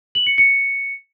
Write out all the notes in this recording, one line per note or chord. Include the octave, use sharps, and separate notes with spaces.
F#7
C#7
C#7